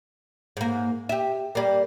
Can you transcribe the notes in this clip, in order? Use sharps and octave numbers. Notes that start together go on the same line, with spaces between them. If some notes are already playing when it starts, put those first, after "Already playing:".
G#2 A#3
G4 E5
G3 A#3